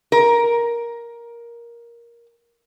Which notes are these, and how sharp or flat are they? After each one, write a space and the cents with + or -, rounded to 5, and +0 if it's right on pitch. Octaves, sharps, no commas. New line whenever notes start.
A#4 +10